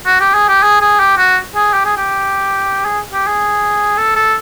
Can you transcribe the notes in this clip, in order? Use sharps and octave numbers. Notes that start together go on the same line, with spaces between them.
F#4
G4
G#4
G4
G#4
G#4
G4
F#4
G#4
G4
G#4
G4
G#4
G4
G#4
A4
A4